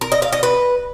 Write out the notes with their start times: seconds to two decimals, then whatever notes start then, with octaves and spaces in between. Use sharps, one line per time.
0.01 A#4
0.12 D#5
0.22 F5
0.32 D#5
0.43 B4